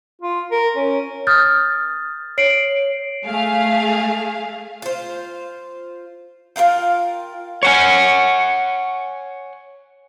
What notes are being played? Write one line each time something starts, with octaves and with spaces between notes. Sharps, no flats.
F4
A#4
C#4
D#6 F6 G6 A6
C#5 C7 D7 F#7
A3 G#4 F5
F4 C5
F4 A#4 F5 G5
C#5 F#5 G#5